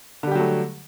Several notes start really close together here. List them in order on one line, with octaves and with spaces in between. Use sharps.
D3 G3 G4 F#3 A3